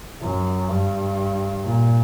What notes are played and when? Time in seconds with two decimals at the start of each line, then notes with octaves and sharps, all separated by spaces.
0.21 F#2
0.69 G2
1.64 A#2